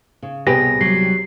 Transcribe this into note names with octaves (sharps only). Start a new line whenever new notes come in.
C#3
C2 B2 G4 G#4 B4 A#6
F#3 G3 C7